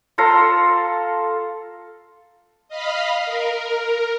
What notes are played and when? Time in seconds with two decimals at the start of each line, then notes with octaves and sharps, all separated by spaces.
0.18 F4 A4 A#5 C6
2.68 D#5 F5 B5
3.25 A#4